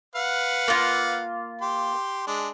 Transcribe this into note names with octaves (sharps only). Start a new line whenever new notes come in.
B4 F5 F#5
A#3 F4
G4 C6
G#3 D4